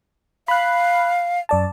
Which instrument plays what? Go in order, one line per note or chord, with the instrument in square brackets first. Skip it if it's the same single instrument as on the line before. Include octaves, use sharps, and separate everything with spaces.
[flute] F5 [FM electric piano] B5 F#6
[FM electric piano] F#2 D5 A5